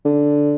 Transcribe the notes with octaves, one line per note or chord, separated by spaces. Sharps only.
D3